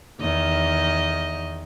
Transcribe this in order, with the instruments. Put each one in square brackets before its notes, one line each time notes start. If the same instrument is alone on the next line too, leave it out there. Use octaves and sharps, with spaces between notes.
[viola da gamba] E2 D#3 D#5